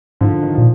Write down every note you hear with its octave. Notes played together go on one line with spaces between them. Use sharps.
G#2 D3 F3
D#3
A#2 F3